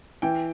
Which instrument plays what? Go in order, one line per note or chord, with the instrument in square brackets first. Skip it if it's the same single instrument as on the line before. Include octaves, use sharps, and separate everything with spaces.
[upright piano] E3 G5